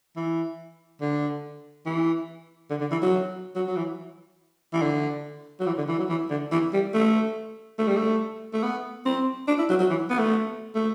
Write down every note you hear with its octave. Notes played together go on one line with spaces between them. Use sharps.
E3
D3
E3
D3
D3
E3
F#3
F#3
F#3
E3
E3
D3
F#3
E3
D3
E3
F#3
E3
D3
E3
G3
A3
A3
G3
A3
A3
B3
C4
D4
E4
F#3
F#3
E3
B3
A3
A3